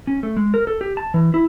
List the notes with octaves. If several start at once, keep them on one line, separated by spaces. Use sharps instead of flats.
C#4
A3
G#3
A#4
A4
G4
A5
E3
E4